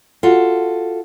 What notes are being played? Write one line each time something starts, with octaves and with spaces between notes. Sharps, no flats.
F4 F#4 A4